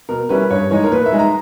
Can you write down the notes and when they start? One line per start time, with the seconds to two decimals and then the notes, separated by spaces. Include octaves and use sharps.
0.09 B2 A#4
0.29 G3 C#4 E4 B4
0.50 G2 C#5
0.71 E3 G#3 D#4 C#5
0.84 A#4
0.92 A#2 B4
1.06 E5
1.13 G#3 D#4
1.19 A#5